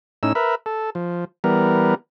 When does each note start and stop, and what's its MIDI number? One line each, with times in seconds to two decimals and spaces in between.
0.23 0.33 45
0.23 0.33 61
0.23 0.33 63
0.23 0.33 88
0.35 0.55 70
0.35 0.55 71
0.35 0.55 76
0.66 0.90 69
0.95 1.25 53
1.44 1.95 52
1.44 1.95 55
1.44 1.95 59
1.44 1.95 70